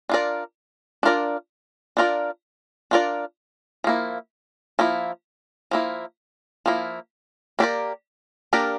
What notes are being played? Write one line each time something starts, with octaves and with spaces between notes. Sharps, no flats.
D4 F4 A#4 D5
D4 F4 A#4 D5
D4 F4 A#4 D5
D4 F4 A#4 D5
F3 A#3 E4
F3 A#3 E4
F3 A#3 E4
F3 A#3 E4
A#3 D4 G4 A#4 D5
A#3 D4 G4 A#4 D5